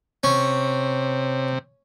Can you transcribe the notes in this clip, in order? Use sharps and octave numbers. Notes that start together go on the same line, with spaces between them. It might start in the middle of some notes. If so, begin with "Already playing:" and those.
C3 C#4